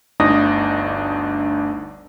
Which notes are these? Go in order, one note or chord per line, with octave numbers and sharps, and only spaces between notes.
G1 D2 D4 D#4 D#6 A#6